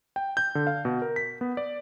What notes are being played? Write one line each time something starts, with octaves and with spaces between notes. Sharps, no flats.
G5
G6
D3
F5
B2
A#4
B6
B3
D5